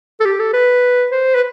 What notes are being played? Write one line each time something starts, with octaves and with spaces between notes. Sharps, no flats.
A4
G4
A4
B4
C5
B4